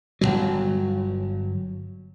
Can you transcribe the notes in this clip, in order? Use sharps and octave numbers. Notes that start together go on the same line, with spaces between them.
G1 D#2 F#3